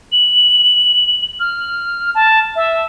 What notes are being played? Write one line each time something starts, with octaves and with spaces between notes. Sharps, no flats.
F#7
F6
A5
E5